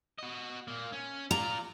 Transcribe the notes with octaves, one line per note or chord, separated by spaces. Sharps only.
F#4 D#5
A#2 A#3
C#4
F4 D5 A#5